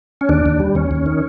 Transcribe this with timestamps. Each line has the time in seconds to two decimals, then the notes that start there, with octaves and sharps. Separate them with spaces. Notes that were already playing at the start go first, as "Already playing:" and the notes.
0.21 C#4
0.29 D#2 D4
0.46 D#2
0.60 G3
0.75 D#2 C#4
0.91 D#2
1.06 D#3